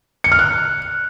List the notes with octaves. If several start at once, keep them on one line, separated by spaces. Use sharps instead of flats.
C#7
F6
F#6